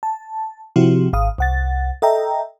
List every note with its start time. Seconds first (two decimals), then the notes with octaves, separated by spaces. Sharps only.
0.03 A5
0.76 C3 F3 C4 E4 F#4 G4
1.13 G#1 F5 D#6
1.38 C2 F#5 A6
2.02 A4 D#5 E5 G5 A#5